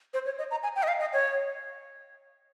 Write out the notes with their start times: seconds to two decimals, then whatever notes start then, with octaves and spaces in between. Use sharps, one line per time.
0.14 C5
0.25 C#5
0.38 D#5
0.51 A#5
0.63 G#5
0.76 G5
0.83 D#5
0.88 F5
1.00 D#5
1.13 C#5